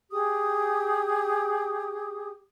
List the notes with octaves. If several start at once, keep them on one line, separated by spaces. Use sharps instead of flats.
G4 G#4 D#6